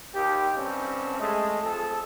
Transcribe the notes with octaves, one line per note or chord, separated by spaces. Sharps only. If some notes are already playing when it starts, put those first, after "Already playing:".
D#2 G4
G2 D3 C4 C#4
G#3 A3
F2 G#4 A4